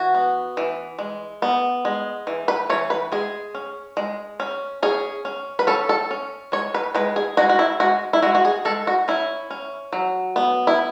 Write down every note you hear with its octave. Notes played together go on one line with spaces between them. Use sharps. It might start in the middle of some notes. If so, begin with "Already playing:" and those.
Already playing: E3 F#4
B3
E3
G#3
B3
G#3
E3
B4
E3 C#5
B4
G#3 G#4
C#4
G#3
C#4
C#4 G#4
C#4
B4
C#4 A4
A4
C#4
G#3 C#5
B4
G#3 B4
G#4
G#3 F#4
F#4
E4
G#3 F#4
E4
G#3 F#4
F#4
G#4
G#3 A4
F#4
C#4 E4
C#4
F#3
B3
E4